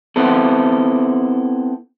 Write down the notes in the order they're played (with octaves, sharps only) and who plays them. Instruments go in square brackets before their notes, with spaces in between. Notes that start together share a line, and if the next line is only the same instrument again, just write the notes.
[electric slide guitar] B3 C4 E4 A4